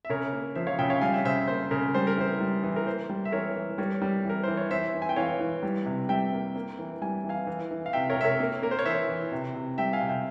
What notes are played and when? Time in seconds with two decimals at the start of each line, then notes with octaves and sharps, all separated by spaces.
0.05 E5
0.09 C#3 A#4 C#5
0.33 A#3
0.55 F3 C5 E5
0.67 C#5 F5
0.79 C#3 E5 G5
0.90 C#5 F5
1.01 G3 F5 G#5
1.13 E5 G5
1.25 C#3 C5 E5
1.47 A#3 C5
1.71 C#3 A#4
1.94 G3 C5
2.07 A#4
2.17 E3 C5
2.40 G3
2.64 E3
2.76 A#4
2.86 A#3 C5
3.09 G3
3.25 E5
3.32 E3 A#4 C#5
3.55 E3
3.78 G3 A#4 C#5
4.02 G3
4.25 E3 A#4
4.43 E3 C5
4.57 C#5
4.71 E3 C5 E5
4.95 E3
5.02 G#5
5.09 G5
5.16 E3 C#5 F5
5.40 E3
5.63 G3
5.86 C3
6.09 G3 E5 G5
6.32 A#3
6.56 A#3
6.79 E3
7.01 G3 G#5
7.24 E3
7.29 F5 G#5
7.47 E3
7.71 E3
7.86 F5
7.93 C3 E5 G5
8.10 A#4 C#5
8.17 C3 E5
8.24 A#4 C#5
8.40 A#3
8.62 A#3 A#4
8.71 C5
8.79 C#5
8.85 E3 C5 E5
9.09 E3
9.32 C3
9.55 C3
9.78 G3 E5 G5
9.93 F5 G#5
10.01 C3
10.09 E5 G5